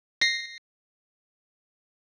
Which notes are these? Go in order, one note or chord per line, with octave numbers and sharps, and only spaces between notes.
A#6 C7